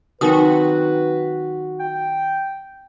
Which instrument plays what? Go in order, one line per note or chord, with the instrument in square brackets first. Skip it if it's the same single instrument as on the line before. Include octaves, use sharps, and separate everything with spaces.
[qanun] D#3 F#3 C4 [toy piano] D#4 A#4 D#6 [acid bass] F#4 [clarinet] B4
[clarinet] G5